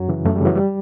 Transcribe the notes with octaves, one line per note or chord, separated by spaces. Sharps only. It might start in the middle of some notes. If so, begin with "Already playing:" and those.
Already playing: F#2 F#3
C#3 E3
F#2 A3
G3
C#3 E3 F#3
G3